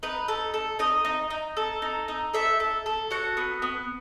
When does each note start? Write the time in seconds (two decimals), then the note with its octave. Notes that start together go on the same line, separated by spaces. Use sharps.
0.03 D#4 B4
0.28 A4
0.54 A4
0.79 D#4 D#5
1.05 D#4
1.30 D#4
1.57 A4
1.82 D#4
2.08 D#4
2.33 A4 E5
2.60 A4
2.86 A4
3.11 F#4 F#5
3.37 B3
3.62 B3